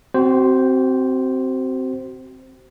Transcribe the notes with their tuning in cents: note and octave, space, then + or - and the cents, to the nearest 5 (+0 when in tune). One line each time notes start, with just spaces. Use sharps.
C4 +0 F#4 +35 C5 +0